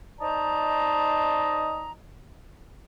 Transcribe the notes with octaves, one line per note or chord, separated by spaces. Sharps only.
D#4 C5 D5 D#5 A5 A#5